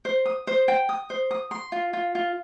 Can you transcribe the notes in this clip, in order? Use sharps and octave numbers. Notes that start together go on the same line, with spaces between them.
C5
D#6
C5
G5
D#6
C5
D#6
C6
F4
F4
F4